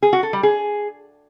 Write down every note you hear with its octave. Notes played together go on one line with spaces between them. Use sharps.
G#4
F#4
A4
G3
G#4